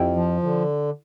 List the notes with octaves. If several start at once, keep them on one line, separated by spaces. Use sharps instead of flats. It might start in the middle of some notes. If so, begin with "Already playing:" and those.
Already playing: F2 E4 G4
F3
D3